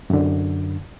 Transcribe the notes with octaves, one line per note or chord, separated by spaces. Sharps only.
F#2 D3